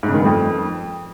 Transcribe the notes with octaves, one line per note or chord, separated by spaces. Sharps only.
G#2
C#3
D#3
G2
F2